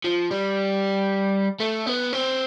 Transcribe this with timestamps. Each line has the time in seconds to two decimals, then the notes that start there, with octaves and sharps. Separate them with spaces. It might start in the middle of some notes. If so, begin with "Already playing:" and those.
0.05 F3
0.31 G3
1.60 A3
1.87 B3
2.13 C4